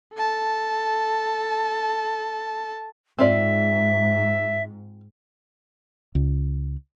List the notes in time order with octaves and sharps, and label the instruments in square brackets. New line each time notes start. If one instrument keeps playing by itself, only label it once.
[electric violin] A4 A5
[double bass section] G#2 [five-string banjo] C4 F4 D5 [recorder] E5
[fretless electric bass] C#2